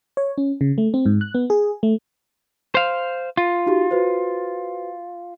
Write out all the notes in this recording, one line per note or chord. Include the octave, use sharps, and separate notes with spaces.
C#5
C#4
C#3
A3
C4
G#2
F#6
B3
G#4
A3
C5 F5
F4
D#4 F#4 G4
F#4 B4 C5